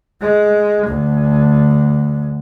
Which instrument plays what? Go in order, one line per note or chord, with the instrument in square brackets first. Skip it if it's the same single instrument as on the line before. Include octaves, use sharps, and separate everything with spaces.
[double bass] G#3
D2